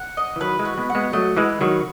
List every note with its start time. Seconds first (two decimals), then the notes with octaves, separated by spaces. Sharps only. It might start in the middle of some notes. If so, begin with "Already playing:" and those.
Already playing: F#5
0.17 D#5
0.36 E3
0.40 D#3 F#3 B4
0.59 E3 G#3
0.65 F#4
0.78 G#3 B3
0.90 F#5
0.95 G#3 B3
1.13 F#3 A3 D#5
1.37 E3 G#3 B4
1.61 D#3 F#3 F#4